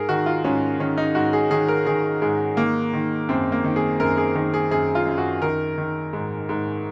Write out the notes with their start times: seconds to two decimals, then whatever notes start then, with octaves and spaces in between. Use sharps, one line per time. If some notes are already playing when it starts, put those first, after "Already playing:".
Already playing: G#2 G#4 A#4
0.09 D#3 F#4
0.26 F4
0.44 G#2 C#4
0.80 D#3 C#4
0.97 D#4
1.15 G#2 F#4
1.33 G#4
1.51 D#3 G#4
1.68 A#4
1.87 D#3 G#4
2.22 G#2 G#4
2.57 D#3 A#3
2.93 D#3
3.29 F#2 C4
3.52 A#3
3.64 D#3
3.76 G#4
4.00 F#2 A#4
4.17 G#4
4.35 D#3 A#4
4.54 G#4
4.71 F#2 G#4
4.95 F4
5.07 F#2
5.18 F#4
5.42 D#3 A#4
5.78 D#3
6.13 G#2
6.49 G#2